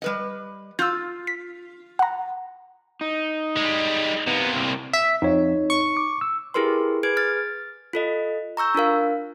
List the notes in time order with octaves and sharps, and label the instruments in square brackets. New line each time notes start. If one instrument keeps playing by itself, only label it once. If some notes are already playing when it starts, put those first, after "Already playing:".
[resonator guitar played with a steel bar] G3 B4 D#5
[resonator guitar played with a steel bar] F4 [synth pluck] E6 G6
[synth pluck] B6
F#5 A#5
[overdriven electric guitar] D#4
[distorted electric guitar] G3 G#3
[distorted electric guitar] C3 A#3 [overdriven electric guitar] B3
[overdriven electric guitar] C2
[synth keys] E5
[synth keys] F2 [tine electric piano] D#4 C#5
[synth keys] C#6
[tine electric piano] D6
E6
[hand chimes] E4 G4 G#4 A#4 B4 C6
G#4 B4 G#6 D7
F6 A6
F4 A4 D#5
A#5 C#6 E6 G6
D4 F4 A#4 F5